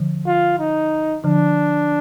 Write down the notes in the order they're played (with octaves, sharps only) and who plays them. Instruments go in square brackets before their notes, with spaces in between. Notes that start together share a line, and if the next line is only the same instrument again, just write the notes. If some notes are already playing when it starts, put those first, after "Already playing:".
Already playing: [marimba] D3 F3
[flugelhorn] F4
D#4
[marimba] D3 F3 [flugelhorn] D4